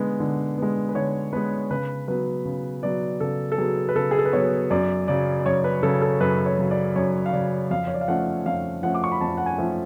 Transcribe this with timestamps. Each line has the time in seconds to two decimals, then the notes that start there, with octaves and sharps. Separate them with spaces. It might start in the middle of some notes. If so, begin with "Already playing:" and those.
Already playing: D3 G#3 B3
0.20 D3
0.58 G#3 B3
0.89 B4
0.95 D3 C#5
1.33 G#3 B3 B4
1.70 C#3 B4
2.08 F#3 B3 B4
2.45 C#3
2.83 F#3 B3 D5
3.20 C#3 A4
3.52 A4
3.58 F#3 B3 G#4
3.89 B4
3.95 C#3 A4
4.11 G#4
4.19 A4
4.25 B4
4.33 F#3 B3 C#5
4.70 F#2 D5
5.08 C#3 F#3 D5
5.40 D5
5.46 F#2 C#5
5.64 B4
5.83 C#3 F#3 A4
6.02 A4
6.20 F#2 B4
6.46 C#5
6.58 C#3 F#3
6.71 D5
6.96 F#2 C#5
7.26 F5
7.33 C#3 F#3 D5
7.71 F2 F5
7.87 C#5
7.94 D5
8.01 F5
8.08 F3 A3 C#4 F#5
8.46 F2 F5
8.83 F3 A3 C#4 F#5
8.94 D6
9.04 C#6
9.12 B5
9.21 F2 A5
9.37 F#5
9.46 G#5
9.58 F3 A3 C#4